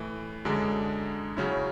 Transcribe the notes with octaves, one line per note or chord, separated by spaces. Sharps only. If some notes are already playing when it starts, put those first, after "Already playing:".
Already playing: A2 E3 A3
F#2 D3 G#3 D4
C#3 F#3 C#4 E4